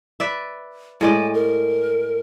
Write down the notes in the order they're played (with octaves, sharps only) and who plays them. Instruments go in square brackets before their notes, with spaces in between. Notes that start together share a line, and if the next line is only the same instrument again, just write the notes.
[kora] B4 D5 E5
[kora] A2 G#3 D5 [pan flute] G#5
[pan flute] A#4